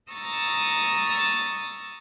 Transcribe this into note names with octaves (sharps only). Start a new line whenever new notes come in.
A#5 C#6 D#6 E6 A6